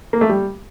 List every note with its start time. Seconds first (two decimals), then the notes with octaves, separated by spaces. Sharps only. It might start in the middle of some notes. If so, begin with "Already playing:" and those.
0.13 A#3
0.21 A3
0.29 G3